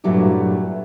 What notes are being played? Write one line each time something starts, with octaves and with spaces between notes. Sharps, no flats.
G2 A#2 F#3 A3 E4 G4